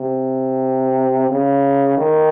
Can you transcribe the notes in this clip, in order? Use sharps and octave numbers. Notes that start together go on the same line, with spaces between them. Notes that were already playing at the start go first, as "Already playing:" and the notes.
Already playing: C3
C#3
D#3